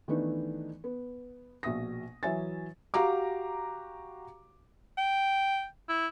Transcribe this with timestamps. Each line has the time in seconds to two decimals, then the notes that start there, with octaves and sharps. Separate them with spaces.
0.08 D#3 E3 A3 B3 D4 D#4
0.84 B3
1.63 A#1 B2 E5 D#6 A#6
2.23 E3 F#3 C#5 E5 G#5 A6
2.94 F#4 G4 F5 A#5 D6
4.98 G5
5.89 E4